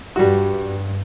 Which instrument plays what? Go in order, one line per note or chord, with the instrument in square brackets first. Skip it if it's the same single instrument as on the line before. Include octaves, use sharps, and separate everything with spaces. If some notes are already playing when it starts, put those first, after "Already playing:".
[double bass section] G2 [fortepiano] G3 F#4